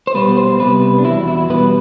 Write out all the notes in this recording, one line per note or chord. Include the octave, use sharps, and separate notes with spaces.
C5
B2 G3 B3 B4
C5
C3 G3 B3 B4
D4
E2 B2 F#3 E4
E4
B2 G3 B3 B4